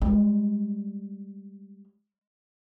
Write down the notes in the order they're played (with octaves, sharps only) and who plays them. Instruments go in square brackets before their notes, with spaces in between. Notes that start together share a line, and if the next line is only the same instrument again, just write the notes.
[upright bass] G3 G#3